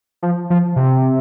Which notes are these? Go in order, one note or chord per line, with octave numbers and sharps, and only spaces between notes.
F3
F3
C3